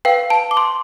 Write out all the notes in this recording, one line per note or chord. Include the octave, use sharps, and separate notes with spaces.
B4 F5 G5
A5
D6
C6